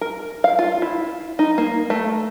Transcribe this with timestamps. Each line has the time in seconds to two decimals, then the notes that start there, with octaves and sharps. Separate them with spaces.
0.01 A#4
0.44 F5
0.59 F4
0.82 E4
1.39 D#4
1.58 A#3
1.90 A3